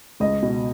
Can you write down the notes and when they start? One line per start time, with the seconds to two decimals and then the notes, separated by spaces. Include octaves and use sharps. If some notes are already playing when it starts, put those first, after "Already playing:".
0.20 C#2 D#5
0.42 B2